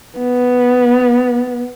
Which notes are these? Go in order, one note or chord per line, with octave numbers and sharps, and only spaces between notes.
B3